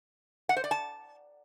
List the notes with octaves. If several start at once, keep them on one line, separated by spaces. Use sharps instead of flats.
F#5
C5
D5
A5